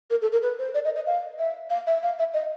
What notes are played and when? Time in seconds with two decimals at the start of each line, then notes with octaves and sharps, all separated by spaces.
0.10 A#4
0.22 A4
0.32 A#4
0.43 B4
0.59 C5
0.74 D5
0.85 D#5
0.96 D#5
1.07 F5
1.39 E5
1.70 F5
1.87 E5
2.03 F5
2.19 E5
2.34 D#5